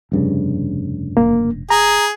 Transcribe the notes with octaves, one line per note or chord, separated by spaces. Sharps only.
F1 G2 C#3
E1 A#3
G#4 A#5